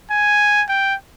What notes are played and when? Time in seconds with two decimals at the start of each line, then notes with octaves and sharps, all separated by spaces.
0.11 G#5
0.69 G5